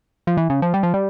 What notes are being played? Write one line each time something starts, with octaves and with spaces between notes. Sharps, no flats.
F3
E3
C#3
F3
G3
F3
G3